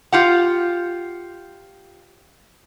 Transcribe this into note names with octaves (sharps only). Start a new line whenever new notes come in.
F4 G4 F#5